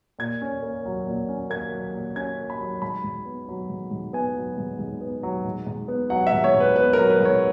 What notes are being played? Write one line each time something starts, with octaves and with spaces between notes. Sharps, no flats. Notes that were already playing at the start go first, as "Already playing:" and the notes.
A#2 G#6
C#4
A#3
F#3
A#2
C#4
A#3 G#6
F#3
A#2
C#4 G#6
A#3
B5
F#3
G#2 B5
G#2
B3
F#3
G#2
G#2
B3 G#5
F#3
G#2
G#2
B3
F#3
G#2
G#2
B3
F#3 F#5
E5
G#2
C#5
G#2
B4
B3 B4
A#4
F#3
B4
G#2
C#5